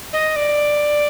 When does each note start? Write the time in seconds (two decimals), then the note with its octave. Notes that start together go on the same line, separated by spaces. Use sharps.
0.13 D#5
0.36 D5